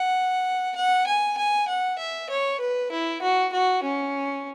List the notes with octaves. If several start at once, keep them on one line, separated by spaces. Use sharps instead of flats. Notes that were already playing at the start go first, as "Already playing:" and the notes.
Already playing: F#5
F#5
G#5
G#5
F#5
E5
C#5
B4
E4
F#4
F#4
C#4